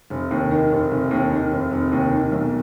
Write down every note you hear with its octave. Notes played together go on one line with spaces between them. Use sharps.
F1
D#2
D#3
F1
F1
D#2
D#3
F1
F1
D#2
D#3
B1